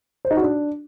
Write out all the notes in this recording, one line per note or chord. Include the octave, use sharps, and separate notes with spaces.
C5
D#4
F#4
D4